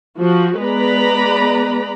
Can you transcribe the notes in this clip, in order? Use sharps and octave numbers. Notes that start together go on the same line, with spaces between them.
F3 F#4
G#3 B3 B4 D5 A#5 B5